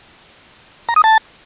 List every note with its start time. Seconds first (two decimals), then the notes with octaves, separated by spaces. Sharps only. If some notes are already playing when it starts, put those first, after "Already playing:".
0.89 A#5
0.96 D#6
1.04 A5